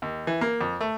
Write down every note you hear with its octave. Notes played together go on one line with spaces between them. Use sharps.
D#2
E3
A#3
F2
A3